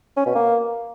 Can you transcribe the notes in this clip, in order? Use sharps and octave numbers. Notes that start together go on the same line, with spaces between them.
C#4
B2
A#3